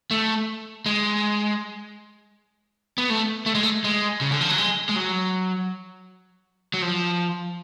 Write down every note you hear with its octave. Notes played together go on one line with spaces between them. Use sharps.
A3
G#3
B3
A3
A3
G#3
A3
G#3
C#3
D3
F3
F#3
G#3
G#3
F#3
F#3
F3